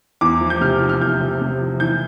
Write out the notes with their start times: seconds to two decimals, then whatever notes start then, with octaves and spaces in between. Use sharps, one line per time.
0.21 E2 D6
0.41 F3
0.50 G6
0.61 C3 F6
0.81 F3
0.89 F6
1.01 E2 G6
1.21 C3
1.41 C3
1.61 F3
1.80 E3 G6